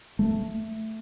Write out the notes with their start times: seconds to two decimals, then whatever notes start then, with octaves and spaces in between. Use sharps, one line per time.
0.19 A3